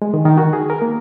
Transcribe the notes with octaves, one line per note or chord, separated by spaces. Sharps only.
G#3
D#3
D#3
F#4
G#4
A#4
A#3